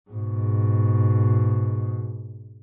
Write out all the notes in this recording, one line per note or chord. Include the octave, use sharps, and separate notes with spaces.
G#2 B2